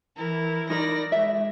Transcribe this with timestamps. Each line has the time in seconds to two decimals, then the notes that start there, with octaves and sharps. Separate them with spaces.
0.17 E3 E4 A#4
0.70 D#4 A#4 D5 B5 A#6
1.12 G#3 E5